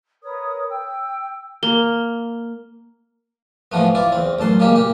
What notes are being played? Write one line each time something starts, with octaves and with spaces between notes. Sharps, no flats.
A#4 B4 C#5 D#6
G5 E6
A#3 G7
A2 E3 F3 A3 B3
E4 F4 D5
E2 C4
A1 F#2 A5 C6
A#2 C#3 G#3 A#3 G4
A#2 G4